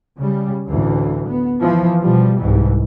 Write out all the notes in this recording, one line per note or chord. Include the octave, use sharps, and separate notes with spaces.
C#3 G3
A1 D2 E3
B3
E3 F3
B2 F3 G3
C2 G#2 E3